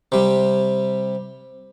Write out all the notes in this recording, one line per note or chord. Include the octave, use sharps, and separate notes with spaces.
C3 G3